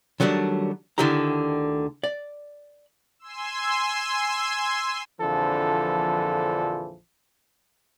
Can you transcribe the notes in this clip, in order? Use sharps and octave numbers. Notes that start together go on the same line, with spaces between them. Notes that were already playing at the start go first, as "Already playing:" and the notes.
D#3 F#3 G3 A3 D4
D2 D3 D#3 E4 G4 A#5
D5
G#5 C6 E6
A#1 F2 D3 E3 F3 A4